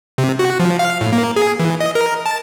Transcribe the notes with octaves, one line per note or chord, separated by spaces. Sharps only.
C3
F#4
F3
F5
A2
A#3
G#4
E3
D#5
A#4
A5